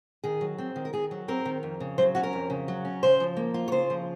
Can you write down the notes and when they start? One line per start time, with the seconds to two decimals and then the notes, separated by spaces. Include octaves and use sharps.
0.24 D#3 G#4
0.41 F#3
0.58 C4
0.76 D#3
0.85 A#4
0.93 D#3 G#4
1.11 F#3
1.28 C4 A#4
1.45 D#3
1.63 F2
1.80 C#3
1.98 F#3 C5
2.15 C#4 F#4
2.23 A#4
2.33 F2
2.50 C#3
2.68 F#3
2.85 C#4
3.03 C#3 C5
3.20 F3
3.37 A#3
3.54 F4
3.68 C#5
3.72 C#3 C5
3.90 F3